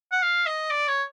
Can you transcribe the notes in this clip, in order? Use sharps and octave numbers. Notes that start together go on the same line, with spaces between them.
F#5
F5
D#5
D5
C#5